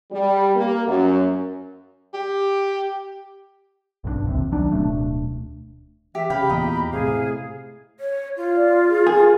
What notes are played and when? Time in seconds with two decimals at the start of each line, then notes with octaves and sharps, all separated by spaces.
0.12 G3
0.55 A#3
0.87 F#2
2.14 G4
4.04 B1 G2 G#3 D4
4.24 D#1 D#2 C3
4.51 C2 D#3 F#3 D4
4.72 D1 B2 A3 D4
6.15 E3 G4 E5
6.30 C#3 G4 F5 G5 B5
6.49 E2 A#2 A#4 D#5
6.92 A2 C3 G#4 F5
8.00 C#5
8.37 F4
8.56 D5
8.89 G#4
9.07 G#4 A#4